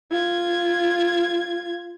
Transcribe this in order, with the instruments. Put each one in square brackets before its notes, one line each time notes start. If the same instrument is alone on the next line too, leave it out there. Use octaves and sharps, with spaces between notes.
[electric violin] F4 G#6